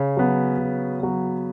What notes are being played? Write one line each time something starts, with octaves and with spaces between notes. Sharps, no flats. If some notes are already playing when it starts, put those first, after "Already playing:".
Already playing: C#3
F#3 B3
C#3
F#3 B3